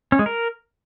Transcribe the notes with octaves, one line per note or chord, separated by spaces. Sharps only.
C#4
G#3
A#4